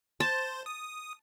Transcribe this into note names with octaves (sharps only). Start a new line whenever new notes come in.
C5 A5
D#6